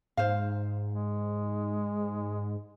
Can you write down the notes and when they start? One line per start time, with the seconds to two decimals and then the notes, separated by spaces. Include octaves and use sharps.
0.17 G#2 C5 F5
0.91 G#3